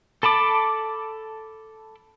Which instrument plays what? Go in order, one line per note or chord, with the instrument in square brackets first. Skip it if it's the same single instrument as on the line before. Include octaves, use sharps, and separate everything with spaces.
[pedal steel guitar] A4 A5 B5 D6